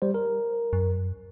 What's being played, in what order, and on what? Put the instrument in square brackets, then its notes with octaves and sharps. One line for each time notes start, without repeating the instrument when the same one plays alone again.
[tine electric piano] G3 C5
A#4
[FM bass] F#2